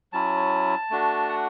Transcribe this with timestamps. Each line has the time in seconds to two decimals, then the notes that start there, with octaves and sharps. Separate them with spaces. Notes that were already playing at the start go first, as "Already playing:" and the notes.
0.13 F#3 C#4 E4 A5
0.90 A3 D4 F#4
1.29 F#5